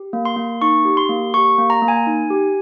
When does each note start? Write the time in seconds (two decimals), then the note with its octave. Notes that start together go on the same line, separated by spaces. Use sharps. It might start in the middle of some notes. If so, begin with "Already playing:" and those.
Already playing: G4
0.13 A#3
0.25 C6
0.36 A#3
0.62 D#4 C#6
0.85 G4
0.97 C6
1.09 A#3
1.34 G4 C#6
1.58 A#3
1.70 A#5
1.82 A#3
1.88 G#5
2.07 D#4
2.30 G4